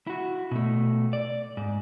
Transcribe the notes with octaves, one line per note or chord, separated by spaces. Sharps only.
E4 F#4
B2 A3
D5
G#2